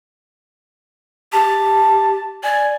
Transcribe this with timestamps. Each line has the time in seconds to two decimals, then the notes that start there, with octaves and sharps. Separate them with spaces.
1.33 G4 A5
2.44 D5 G#5